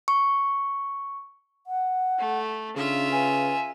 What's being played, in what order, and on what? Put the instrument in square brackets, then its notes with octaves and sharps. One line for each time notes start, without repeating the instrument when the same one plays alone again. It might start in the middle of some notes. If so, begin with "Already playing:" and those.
[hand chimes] C#6
[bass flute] F#5
[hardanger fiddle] A3
[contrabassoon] C#3 [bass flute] D4 [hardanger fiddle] F4 E5
[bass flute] B4 [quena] G#5